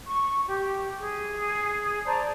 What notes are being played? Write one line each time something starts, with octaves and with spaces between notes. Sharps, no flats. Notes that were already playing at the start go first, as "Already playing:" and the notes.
C#6
G4
G#4
C5 D5 A5 A#5